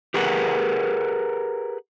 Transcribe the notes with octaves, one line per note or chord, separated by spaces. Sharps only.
G4 G#4 A#4 B4 F#5